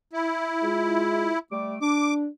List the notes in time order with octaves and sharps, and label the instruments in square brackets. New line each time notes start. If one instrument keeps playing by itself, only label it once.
[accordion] E4
[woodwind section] G#3 F4
G3 A3 D6
[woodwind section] D4 [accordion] D6